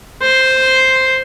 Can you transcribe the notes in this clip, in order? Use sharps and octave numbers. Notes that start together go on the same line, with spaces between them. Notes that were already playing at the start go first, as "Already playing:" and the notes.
C5 C6